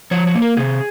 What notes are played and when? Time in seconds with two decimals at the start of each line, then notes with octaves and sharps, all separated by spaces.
0.11 F3 C#5
0.27 C#5
0.35 A#3
0.42 A#4
0.57 C3 G#4